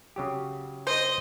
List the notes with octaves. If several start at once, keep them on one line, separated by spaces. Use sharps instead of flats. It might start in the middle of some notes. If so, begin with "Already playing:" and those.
C#3 F#3 G4
C5 D#5